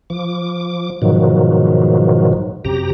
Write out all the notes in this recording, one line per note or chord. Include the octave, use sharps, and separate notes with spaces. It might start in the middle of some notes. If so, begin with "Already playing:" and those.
F3 D6
G#2 B2 D#3 F3 F#3
F#2 C3 G4 A#5